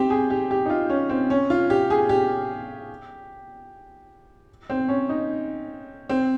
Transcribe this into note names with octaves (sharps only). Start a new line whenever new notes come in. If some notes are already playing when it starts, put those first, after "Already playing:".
Already playing: C4 G4
G#4
G4
G4
D#4
F4
C#4
C4
C#4
F4
G4
G#4
G4
C4
C#4
D#4
C4